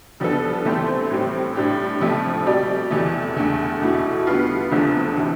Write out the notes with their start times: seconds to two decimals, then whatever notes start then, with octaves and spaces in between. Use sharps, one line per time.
0.20 G2 F3 B3 D4 A4
0.65 E3 A3 C4 G4 C5
1.10 A2 G3 C4
1.55 A2 G3 D4 G4
2.00 F2 C3 F3 A3
2.46 B2 G3 C4 G4 D5
2.91 E2 C3 E3 A3
3.36 E2 D3 A3
3.81 E2 B2 A3 E4
4.27 D3 G3 B3 F4
4.72 F1 E2 D3 F3 A3
5.17 C3 E3